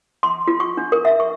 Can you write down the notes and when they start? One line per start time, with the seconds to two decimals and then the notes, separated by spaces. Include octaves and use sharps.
0.23 C6
0.48 F4
0.60 C#6
0.77 D4
0.92 A#4
1.05 E5
1.20 C#6